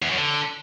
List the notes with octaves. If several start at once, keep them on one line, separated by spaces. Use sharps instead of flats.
E2
F#2
D3